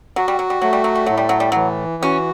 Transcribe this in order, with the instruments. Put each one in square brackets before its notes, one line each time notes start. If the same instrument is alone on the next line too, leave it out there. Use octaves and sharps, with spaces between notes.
[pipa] F#3 [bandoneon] F#4
[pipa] G3
F#3
G3
[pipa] F#3 [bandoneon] A3
[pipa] G3
F#3
G3
[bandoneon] A2 [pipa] F#3
[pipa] G3
F#3
G3
[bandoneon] E3 [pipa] F#3
[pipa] C#4 [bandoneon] F#4